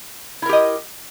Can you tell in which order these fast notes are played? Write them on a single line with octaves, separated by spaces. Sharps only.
E4 A#4 G4 D#5